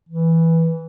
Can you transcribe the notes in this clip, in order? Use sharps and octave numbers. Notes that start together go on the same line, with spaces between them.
E3